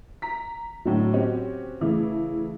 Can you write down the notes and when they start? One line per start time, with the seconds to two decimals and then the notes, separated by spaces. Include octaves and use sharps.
0.22 A#5 B6
0.85 A2 D3 F#3
1.13 C4 C#4 F#4 G4
1.81 C#3 E3 A3